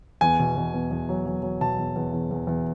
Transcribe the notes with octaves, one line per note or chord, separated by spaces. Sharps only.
E2 G#5
B2
B2
E2
E2
F#3
F#3
F#3
B2 A5
E2
E2
E2
E2
E2